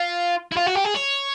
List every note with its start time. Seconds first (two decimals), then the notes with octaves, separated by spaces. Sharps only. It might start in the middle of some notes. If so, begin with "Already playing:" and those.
Already playing: F4
0.52 E4
0.57 F4
0.66 F#4
0.75 G4
0.85 G#4
0.95 C#5